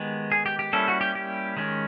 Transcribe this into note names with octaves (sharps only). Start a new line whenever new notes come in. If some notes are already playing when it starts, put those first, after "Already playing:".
Already playing: D#3 G#3 B3 G4
G#4
G4
G4
G3 A#3 C#4 E4 A4
F#4
G4
G4
D#3 G#3 C#4